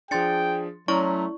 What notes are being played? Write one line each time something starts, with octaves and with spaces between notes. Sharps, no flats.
F3 D4 G#4 G5 C6 A6 C#7
F#3 A3 C#4 E4 D5 A#5 C6 C#6